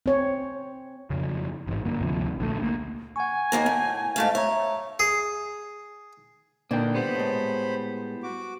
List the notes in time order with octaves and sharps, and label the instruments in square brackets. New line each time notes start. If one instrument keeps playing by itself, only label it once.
[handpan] C4 C#5
[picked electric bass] F2 C#3
A1 G#2
G2 D3 A#3
G1 D2 C3 F3
A#1 D3 D#3 A3
D2 A#3
[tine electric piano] F#5 C#6 [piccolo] G#5
[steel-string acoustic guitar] D#2 A#3 A#4
A2
G#2 A3 F5
[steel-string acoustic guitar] C#5 [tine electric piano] E5 A#5
[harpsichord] G#4
[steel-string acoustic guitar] A#2 D3 B4 [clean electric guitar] A#3 G5
[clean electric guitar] G3 B3 [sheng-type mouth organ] C5 B5
[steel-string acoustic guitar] A2 G#3
[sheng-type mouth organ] F#4 D6